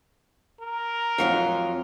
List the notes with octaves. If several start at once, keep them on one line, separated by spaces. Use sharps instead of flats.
A#4
F2 F#3 F4